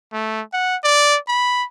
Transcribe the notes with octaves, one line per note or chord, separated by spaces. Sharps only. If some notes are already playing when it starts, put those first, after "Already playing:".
A3
F#5
D5
B5